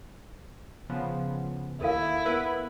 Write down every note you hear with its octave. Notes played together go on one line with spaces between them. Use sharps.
C#3 F3 B3
D#2 E4 A4 A#4 F5
B3 A#4 B4